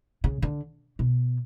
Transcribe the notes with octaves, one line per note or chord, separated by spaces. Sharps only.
C#3
D3
B2